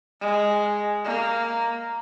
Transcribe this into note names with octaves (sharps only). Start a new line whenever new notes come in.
G#3
A#3